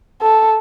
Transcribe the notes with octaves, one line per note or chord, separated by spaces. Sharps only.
A4